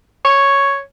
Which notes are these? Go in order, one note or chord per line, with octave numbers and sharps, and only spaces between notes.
C#5